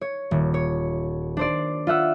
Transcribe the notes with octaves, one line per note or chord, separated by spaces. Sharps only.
C#5
D#1
C#5
D4 C5 D5
F4 E5 F#5 E6